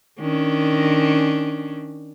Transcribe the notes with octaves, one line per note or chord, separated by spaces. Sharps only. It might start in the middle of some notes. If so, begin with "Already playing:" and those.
D#3 C#4 D4